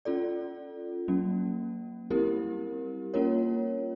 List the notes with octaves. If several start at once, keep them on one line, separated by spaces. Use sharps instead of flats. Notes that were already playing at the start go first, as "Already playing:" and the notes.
C#4 F4 A4 D5
F#3 A#3 C#4
G3 C4 E4 G4 A#4
A#3 C#4 F4 A#4 C#5